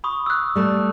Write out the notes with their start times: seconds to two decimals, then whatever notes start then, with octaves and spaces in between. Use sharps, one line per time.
0.04 B5 C#6 D#6
0.26 E6 F#6
0.55 G3 A3